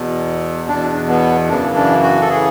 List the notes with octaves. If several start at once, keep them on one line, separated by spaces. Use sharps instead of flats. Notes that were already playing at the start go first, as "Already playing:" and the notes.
Already playing: E2 B2
E2 B2 D4
B3
F#2 C#3 E3 D4
D4
F#4
A4
C#3 E3 G#4